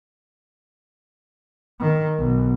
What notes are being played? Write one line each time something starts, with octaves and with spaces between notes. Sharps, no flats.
D#3
B1